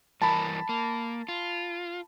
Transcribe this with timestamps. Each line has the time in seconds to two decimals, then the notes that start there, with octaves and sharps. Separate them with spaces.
0.22 G2 E3 A#4 A5 B5
0.69 A#3
1.29 F4